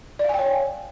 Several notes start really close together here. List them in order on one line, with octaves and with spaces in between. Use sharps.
D5 F5 G#5 G5 C#5